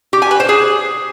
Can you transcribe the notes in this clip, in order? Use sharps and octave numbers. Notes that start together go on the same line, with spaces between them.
G4
G#5
B4
C5
G#4